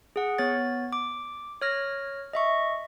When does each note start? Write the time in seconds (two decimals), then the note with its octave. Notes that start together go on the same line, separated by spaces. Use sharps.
0.16 G#4 F#5
0.38 B3 C#5 A6
0.93 D6
1.61 C#5 F6 A#6
2.33 D#5 E5 C#6